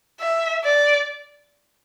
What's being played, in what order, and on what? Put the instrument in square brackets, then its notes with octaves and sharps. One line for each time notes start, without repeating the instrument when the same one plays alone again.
[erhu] E5
D5